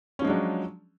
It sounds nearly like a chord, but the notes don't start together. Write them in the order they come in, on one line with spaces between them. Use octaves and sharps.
C#4 F3 G#3 D4 F#3